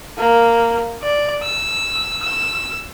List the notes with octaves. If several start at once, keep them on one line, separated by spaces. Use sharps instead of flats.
A#3
D5
E6
E6